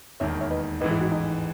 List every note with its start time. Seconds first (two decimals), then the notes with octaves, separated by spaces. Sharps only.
0.20 E1 D#2 D#3 C#5 E5
0.41 C#5 E5
0.51 B4 D#5
0.81 A1 G#2 E3 B4 D#5
0.91 E4 G#4
1.01 D#4 F#4
1.12 D#4